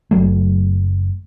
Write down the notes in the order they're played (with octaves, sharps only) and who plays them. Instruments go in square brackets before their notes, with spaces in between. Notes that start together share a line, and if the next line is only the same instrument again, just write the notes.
[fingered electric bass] F#1 F#3 A3